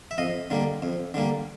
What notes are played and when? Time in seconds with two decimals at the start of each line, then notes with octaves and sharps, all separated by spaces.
0.11 E5
0.18 F2 D#5 F5
0.50 D3 G3 A#3
0.82 F2
1.14 D3 G3 A#3